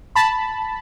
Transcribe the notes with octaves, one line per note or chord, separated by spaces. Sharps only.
A5 B5